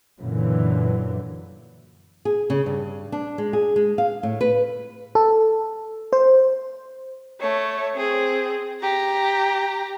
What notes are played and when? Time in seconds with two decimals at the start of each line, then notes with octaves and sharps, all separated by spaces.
0.21 F#2 A#2 D3 E3 F#3
2.25 G#4
2.50 C#3
2.66 G2
3.12 D4
3.38 G#3
3.53 G#4
3.76 G#3
3.98 F5
4.23 A2
4.41 B4
5.15 A4
6.13 C5
7.40 A3 C#5
7.95 C4 G#4
8.81 G4 A#5